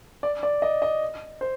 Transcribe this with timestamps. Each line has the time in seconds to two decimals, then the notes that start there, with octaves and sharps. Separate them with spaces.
0.23 D5
0.43 D5
0.62 D#5
0.82 D#5
1.41 C5